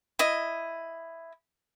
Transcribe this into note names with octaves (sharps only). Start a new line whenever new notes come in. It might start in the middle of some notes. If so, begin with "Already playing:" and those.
E4 D#5